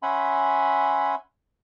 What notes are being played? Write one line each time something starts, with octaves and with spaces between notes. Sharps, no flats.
C#4 E5 F#5 G#5 B5 C6